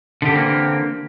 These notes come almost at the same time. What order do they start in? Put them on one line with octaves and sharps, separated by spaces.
D3 G4 E3 C4 A#3